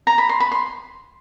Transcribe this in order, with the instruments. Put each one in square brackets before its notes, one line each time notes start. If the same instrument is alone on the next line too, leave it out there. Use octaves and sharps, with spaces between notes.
[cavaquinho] A#5
B5
C6
B5
C6